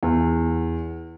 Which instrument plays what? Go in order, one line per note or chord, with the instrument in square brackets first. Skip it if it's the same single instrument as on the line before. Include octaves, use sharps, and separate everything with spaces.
[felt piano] E2